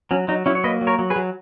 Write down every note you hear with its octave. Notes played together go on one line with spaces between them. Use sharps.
F#3 C#4
F#3 D#4
F#3 C#4 E4
C#5
A#3 B4 D#5
F#3
A#4 C#5
F#3
G#4 B4
F#3